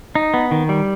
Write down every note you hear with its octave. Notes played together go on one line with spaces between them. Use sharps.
D#4
B3
D#3
G3